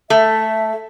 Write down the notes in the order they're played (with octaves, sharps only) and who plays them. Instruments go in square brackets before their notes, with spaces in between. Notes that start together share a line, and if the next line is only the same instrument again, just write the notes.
[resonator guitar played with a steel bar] A3 [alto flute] E5